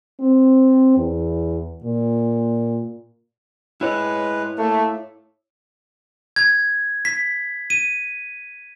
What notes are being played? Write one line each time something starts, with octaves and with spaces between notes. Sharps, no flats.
C4
E2
A#2
G#3 E4 B4 C#5
A3 A#3
G#6
B6
D#7